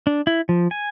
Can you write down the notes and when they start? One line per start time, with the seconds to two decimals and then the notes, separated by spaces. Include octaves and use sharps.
0.07 D4
0.27 E4
0.49 F3
0.71 G#5